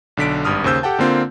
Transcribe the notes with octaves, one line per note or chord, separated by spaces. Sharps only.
B1 D3 B6 D7
G#1 G2 D#6 F6
D#2 C#3 C5 E6 G6
G4 A4 F#5 G5 A5
D3 A#3 C4 F4